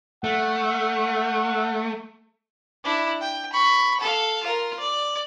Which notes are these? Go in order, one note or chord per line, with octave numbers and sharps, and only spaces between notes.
A3 F#5
D4 E4
G5
B5 C#6
A4 F5
F4 A#4
D5